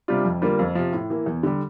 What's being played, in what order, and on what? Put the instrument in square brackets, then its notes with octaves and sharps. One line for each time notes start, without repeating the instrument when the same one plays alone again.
[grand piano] C3 G3 D4 F4
F2
D3 G3 A#3 F4
F2
C3 F3
A2
E3 A#3
E2
D3 G3